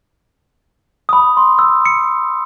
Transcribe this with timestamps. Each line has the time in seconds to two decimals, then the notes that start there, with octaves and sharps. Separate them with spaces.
1.09 B5 D#6
1.37 C6
1.59 E6
1.86 C#7